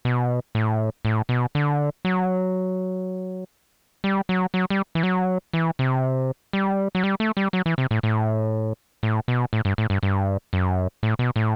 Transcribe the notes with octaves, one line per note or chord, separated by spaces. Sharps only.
B2
A2
A2
B2
D3
F#3
G3
F#3
F#3
G3
E3
F#3
E3
C3
G3
F#3
G3
A3
G3
F#3
E3
C3
A2
A2
A2
B2
A2
G2
A2
G2
G2
F#2
A2
B2
A2